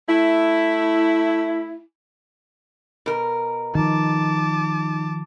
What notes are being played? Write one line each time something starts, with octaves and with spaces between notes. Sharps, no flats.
A3 E4
B2 A#4
D#3 F3 D#4 A5 D6